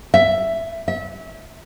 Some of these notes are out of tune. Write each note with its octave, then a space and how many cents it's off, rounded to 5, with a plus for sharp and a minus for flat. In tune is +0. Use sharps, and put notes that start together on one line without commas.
E5 +5
E5 -30